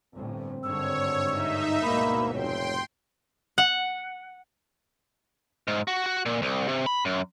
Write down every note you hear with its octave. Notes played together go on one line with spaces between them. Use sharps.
G1 A2 C4
G#1 G2 D3 C#5 E6
D#4 E5
D2 G#2 B2 A#3 B5
F1 C#5 G5 C6
F#5
G#2
F#4
F#4
A#2
C2
C3
B5
F#2